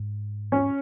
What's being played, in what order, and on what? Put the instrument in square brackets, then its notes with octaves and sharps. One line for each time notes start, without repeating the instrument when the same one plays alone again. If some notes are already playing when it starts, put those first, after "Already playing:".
Already playing: [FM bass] G#2
[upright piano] C#4 C#5